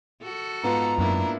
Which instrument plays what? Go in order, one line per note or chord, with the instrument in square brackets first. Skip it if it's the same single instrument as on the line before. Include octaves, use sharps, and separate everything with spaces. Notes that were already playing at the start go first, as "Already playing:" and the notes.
[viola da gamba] F#4 A4
[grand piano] G#2 B3 F4 [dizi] A#5
[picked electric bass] F#2 [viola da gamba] A#3 D4 E4